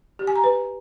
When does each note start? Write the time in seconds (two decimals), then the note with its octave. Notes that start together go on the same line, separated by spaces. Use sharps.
0.19 G4
0.27 G#5
0.36 A#5
0.44 B4